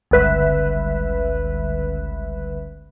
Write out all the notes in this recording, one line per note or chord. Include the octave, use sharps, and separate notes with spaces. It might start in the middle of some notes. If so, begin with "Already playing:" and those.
G1 C#2 B4 E5